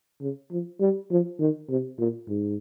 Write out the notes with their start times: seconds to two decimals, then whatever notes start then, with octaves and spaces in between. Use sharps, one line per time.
0.21 C#3
0.51 F3
0.80 G3
1.11 F3
1.40 D#3
1.69 C3
1.99 A#2
2.29 G#2